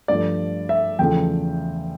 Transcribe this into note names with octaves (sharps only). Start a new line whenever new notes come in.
G2 F3 A3 D5
E5
E2 C#3 F3 A3 G5